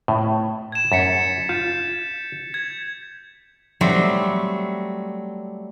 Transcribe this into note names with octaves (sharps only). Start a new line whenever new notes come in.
A2
G#6 E7
F#2 A6 B6 C#7
F4 G6
G#6
F#3 G3 A3 C4